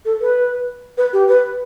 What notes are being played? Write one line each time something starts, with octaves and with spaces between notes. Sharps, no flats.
A4
B4
B4
G4
B4